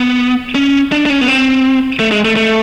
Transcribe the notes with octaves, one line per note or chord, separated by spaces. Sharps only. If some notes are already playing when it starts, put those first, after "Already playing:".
Already playing: B3
C#4
D4
D4
C#4
B3
C4
A3
G#3
A3
A3